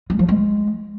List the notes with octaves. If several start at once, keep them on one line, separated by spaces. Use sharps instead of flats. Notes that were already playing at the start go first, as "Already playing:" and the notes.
G#3
F3
G#3